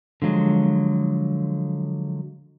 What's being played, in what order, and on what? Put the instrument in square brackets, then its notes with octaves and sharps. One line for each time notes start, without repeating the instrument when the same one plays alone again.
[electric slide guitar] D3 F3 F#3 G#3